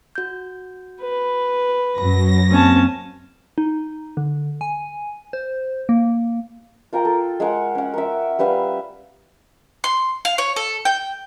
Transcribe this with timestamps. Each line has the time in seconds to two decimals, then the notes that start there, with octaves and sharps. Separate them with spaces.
0.15 F#4 G6
1.02 B4
1.98 F#2 F#3 B5 A#6
2.51 A#3 C4 C#4 A5
3.58 D#4
4.17 D3
4.61 G#5
5.33 C5
5.89 A#3
6.93 F4 A#4 G5 A#5
7.05 A4
7.40 G#3 A#4 F#5
7.75 C#4 F#5
7.94 A#4 E5
8.39 G3 B4 E5 F5
9.84 C6
10.25 F5
10.38 C#5
10.56 A4
10.85 G5